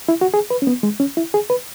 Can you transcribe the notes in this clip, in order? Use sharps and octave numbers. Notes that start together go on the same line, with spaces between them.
E4
F#4
G#4
B4
C#4
B3
G#3
C#4
E4
G#4
B4